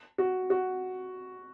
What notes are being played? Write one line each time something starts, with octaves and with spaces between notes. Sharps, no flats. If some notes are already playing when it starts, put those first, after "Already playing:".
F#4
F#4